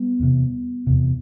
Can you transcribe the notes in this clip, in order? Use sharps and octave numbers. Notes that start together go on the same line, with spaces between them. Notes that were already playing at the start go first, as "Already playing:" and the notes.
Already playing: G3 B3
E2 C3
E2 C3